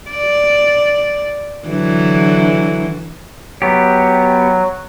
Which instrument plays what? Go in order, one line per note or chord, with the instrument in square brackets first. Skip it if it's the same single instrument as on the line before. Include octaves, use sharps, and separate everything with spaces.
[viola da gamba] D5
D3 E3 F#3
[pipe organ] F#3 [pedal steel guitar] B3 G4